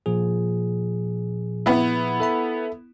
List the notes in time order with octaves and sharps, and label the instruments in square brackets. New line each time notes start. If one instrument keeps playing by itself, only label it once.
[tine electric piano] A#2 F3 G#4
[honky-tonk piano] B3 E4
[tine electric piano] A4 E5 B5